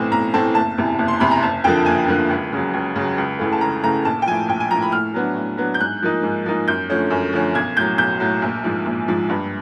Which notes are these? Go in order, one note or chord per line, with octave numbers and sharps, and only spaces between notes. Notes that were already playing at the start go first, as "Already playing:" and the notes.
Already playing: B1 A2 E3 A3 C4
B1 A#5
A2 E3 A3 C4 A5
F#1 A5
E2 C3 E3
F#1
C6
E2 C3 E3 B5
A#5
F#1 A5
F2 D3 F3 A#3 G5
F#1 G#5
F2 D3 F3 A#3
C#2
C#3 F#3
C#2
C#3 F#3
C#2
C#3 E3 A3
A5
C#2 A#5
C#3 E3 A3 A#5
A#1 A5
G5
A2 F3 G#5
A#1 G5
G#5
A2 F3 A#5
B5
A2 F6
F#3 B3 D4
A2
F#3 B3 D4
G6
G#2 F#6
F3 A#3 D#4
G#2
F3 A#3 D#4
F#2 G6
D3 F3 A3 C#4
F#2
D3 F3 A3 C#4
B1 G#6
A2 F#3 G6
B1 G6
A2 F#3
A#1
G#2 F3
A#1
G#2 F3
G2